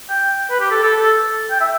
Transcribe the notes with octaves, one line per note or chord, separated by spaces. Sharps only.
G5
B4
G4
A4
A4
A4
G5
E5